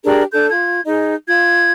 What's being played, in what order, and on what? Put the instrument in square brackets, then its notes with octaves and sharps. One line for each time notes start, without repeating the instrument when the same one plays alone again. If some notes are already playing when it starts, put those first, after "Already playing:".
[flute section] D4 G4 G#4 A#4
D4 A4 G6
F4 G#6
D#4 G#4 D#5
F4 G#6